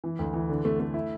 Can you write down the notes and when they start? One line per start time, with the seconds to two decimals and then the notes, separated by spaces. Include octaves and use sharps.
0.04 E3
0.19 D2
0.33 E3
0.49 D3
0.65 A3
0.80 A3
0.94 E4